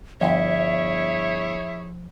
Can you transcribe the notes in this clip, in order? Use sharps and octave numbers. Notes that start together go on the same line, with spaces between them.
G1 F3 E4 G#4 C#5 E5